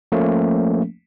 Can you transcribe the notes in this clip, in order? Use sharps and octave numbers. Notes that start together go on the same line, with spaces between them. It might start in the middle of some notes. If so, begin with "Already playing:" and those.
F3 A3 A#3 C#4